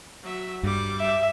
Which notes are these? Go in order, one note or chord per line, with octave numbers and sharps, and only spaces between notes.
F#3 E5
G2 G3 D6
E5